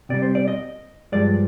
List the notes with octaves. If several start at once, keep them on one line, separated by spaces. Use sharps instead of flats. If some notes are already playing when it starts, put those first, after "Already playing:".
C3 G3 D5
C5
D5
D#5
G2 F3 G#3 D5